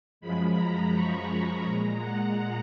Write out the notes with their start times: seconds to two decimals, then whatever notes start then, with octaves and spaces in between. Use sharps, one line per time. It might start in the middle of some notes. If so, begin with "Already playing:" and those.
0.21 F#2 F3 G#3 B5
0.56 A#5
0.92 C#6
1.28 B5
1.64 A#2 G#3 A#5
1.99 F#5